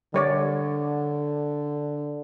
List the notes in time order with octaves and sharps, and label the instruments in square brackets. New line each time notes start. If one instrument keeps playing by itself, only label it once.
[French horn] D3 [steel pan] G3 C#5 D5